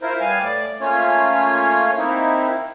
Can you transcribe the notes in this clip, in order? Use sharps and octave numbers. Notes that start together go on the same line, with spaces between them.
E4 F4 A#4 C5
G3 B3 F5 G#5
A2 D5
A3 A#3 C#4 F4 C#5
A#3 C4 D#4 E4